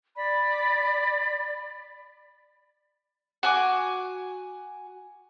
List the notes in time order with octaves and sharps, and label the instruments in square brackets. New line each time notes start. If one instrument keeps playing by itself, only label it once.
[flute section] D5 B5
[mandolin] F#4 G#5 D6